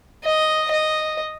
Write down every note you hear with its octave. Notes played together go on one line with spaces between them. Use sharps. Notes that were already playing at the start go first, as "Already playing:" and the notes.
D#5
D#5